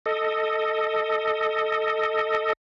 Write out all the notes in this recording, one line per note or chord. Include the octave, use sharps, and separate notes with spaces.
A4 D#5